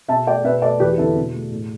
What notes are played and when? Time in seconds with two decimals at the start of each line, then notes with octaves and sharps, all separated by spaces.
0.08 B2 E5 A5
0.27 A3 D5 G5
0.45 B2 B4 E5
0.62 A3 A4 D5
0.80 E2 G4 B4
0.98 D3 B3 E4 A4
1.17 B2
1.34 A3
1.52 A2